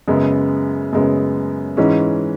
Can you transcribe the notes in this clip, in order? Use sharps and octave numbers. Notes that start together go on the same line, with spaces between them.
F#2 C#3 G#3 B3
F#2 C#3 G#3 B3
G#2 E3 G#3 C#4